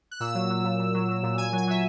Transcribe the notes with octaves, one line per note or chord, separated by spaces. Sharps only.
F#6
A#2 E6
F#3
F#3
A#2
A#2
F#3
F#3
A#2
A#2 G#5
F#3
G#5
F#3 E5